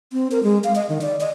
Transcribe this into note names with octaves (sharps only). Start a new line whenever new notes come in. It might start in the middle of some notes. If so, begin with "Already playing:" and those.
C4
A#4
G#3
F5
D#5
D#3
D5
D#5